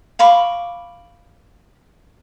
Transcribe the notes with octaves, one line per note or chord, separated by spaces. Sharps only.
F5 B5 C#6 D6